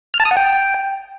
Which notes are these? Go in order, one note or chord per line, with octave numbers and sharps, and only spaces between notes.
F6
A5
D#6
F#5
G5